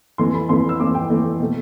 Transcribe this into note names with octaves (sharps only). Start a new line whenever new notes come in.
F2 E3 A3 C6
B5
F2 E3 A3 C6
E6
F2 E3 A3 D6
G5
F2 E3 A3
B2 A3